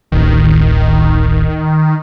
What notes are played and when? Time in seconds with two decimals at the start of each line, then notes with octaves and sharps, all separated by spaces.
0.12 D1 A1 D#3